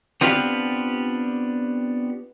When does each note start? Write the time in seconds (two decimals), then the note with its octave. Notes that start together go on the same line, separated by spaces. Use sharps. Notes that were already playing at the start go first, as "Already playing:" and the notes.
0.21 B3 C4 D4 F4 G4 B4